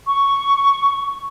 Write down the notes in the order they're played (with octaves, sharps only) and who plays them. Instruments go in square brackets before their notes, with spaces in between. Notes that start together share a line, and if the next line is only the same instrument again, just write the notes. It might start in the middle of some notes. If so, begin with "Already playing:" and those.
[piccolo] C#6